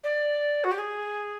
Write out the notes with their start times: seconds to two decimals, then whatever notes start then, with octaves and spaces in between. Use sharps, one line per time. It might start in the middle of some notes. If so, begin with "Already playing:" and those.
0.03 D5
0.63 F#4
0.71 G4
0.77 G#4